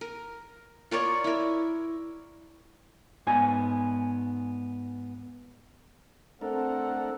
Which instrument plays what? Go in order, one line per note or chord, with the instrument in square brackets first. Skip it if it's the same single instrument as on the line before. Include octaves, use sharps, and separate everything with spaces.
[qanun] A#4
F4 A#4 C#5 D5
E4 A#4
[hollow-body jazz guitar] G#2 B3 G#5
[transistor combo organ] A3 D4 A#4 [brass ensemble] C4 [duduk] A4 [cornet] F#5